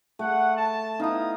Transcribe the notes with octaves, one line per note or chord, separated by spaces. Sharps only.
A3 F#5
A5
B3 D#4 E4 F5 D#6